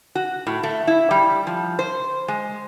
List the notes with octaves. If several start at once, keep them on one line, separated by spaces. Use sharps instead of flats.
F#4
A2
A3
E4
G3
F3
C5
G#3